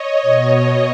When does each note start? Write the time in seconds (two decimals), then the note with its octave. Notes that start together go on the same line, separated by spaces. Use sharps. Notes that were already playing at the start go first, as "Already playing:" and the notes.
Already playing: C#5 D#5
0.22 B2